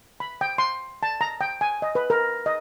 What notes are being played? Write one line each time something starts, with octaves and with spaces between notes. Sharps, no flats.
B5
G5
C6
A5
A#5
G5
G#5
D#5
B4
A#4
D#5